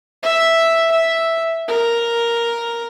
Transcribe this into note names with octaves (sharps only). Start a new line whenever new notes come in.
E5
E5
A#4